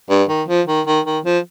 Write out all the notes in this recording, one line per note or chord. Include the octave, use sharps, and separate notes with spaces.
G2
D#3
F3
D#3
D#3
D#3
F3